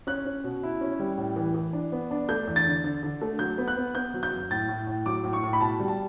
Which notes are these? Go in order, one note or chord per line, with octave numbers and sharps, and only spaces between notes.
C#4 F#6
C#4
B2
E4
C#4
G3
A2
E3
E3
D4
B3
D4
A3 G6
E2
A6
D3
D3
D3
A3
F#3 G6
B3
F#6
B3
B3 G6
F#3
G6
F#2
A2 A6
A2
A2
F#3 D6
A2
C#6
A2
B5
B2 A5
G3
A5